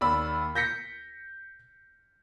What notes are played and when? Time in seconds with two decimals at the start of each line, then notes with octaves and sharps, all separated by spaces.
0.01 D#2 D5 B5 E6
0.55 G6 A#6 B6 C#7